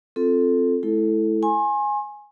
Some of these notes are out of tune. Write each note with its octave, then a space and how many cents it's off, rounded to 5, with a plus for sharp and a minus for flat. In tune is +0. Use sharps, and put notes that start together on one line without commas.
C4 +0 F4 +0 A4 +0
A3 -40 E4 +0 A4 +0
G#5 +0 C6 +40